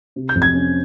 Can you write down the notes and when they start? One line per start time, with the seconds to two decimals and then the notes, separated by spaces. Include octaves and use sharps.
0.16 C3
0.29 G6
0.35 F2
0.42 G#6
0.54 C#4